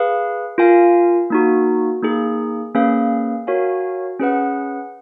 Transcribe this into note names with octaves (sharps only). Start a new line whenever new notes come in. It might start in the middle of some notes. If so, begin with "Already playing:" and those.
Already playing: G#4 B4 F5
F4 A#4 F5 G#5
A#3 D#4 F#4
A#3 D#4 G#4
A#3 C#4 G#4 B4 F5
F#4 A#4 C#5 F5 G#5
C#4 G#4 B4 F#5